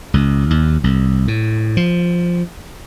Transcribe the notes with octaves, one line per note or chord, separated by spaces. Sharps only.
C#2
D#2
C2
A2
F3